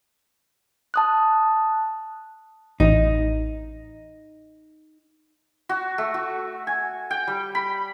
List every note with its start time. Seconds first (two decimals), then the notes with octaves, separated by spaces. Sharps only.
0.94 A5 D#6 F#6
2.80 A1 D#4
5.69 F#4
5.98 A3
6.14 F#4
6.67 G#5
7.11 G5
7.27 G3
7.55 B5